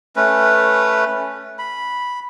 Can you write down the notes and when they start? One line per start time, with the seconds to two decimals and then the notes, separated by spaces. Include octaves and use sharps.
0.16 A3 C#4 B4
1.59 B5